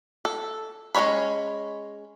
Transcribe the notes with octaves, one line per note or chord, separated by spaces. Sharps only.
A4
G#3 C#4 D4 C#5 B5